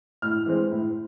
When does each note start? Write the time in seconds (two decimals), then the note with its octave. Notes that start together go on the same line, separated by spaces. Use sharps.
0.22 A2 F6
0.46 E3 G#3 C4
0.71 A2